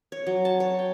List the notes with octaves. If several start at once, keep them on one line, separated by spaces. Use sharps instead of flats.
C#5
F#3
A5
C#5
G5